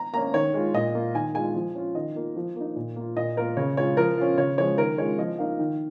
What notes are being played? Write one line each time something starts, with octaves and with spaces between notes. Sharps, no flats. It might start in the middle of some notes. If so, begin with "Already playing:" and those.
Already playing: A#5
A#3 C#4 A#5
D#3 C#5
G#3 F4
A#2 D#5
A#3 F4
D#3 G#5
G#3 F4 G#5
F3
C#4 F4
D#3 D#5
A#3 F4
F3
A#3 D#4
A#2
A#3 F4
A#2 D#5
A#3 F4 A#4
C#3 C#5
G#3 C#4 F4 C#5
F3 A#4
C#4 F4
C#3 C#5
F3 G#3 C#5
D#3 A#4
G#3 C#4 F4 C#5
F3 D#5
A#3 D#4 F5
D#3